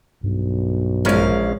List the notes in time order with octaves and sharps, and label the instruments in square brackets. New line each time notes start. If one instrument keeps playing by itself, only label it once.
[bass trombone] B1 [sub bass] G2
[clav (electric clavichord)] A#1 C#4 A#4 [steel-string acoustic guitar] G#3 F5